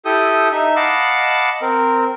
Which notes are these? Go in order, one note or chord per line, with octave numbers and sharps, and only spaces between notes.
E4 G4 A4 D#6 G6
D#4 E5
D#5 F5 F#5 A5 B5 D6
C4 A#4